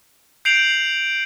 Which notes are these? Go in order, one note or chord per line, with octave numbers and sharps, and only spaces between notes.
G6 C7 D7 F7 F#7